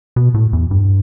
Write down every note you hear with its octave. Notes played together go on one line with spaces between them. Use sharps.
B2
A2
E2
G2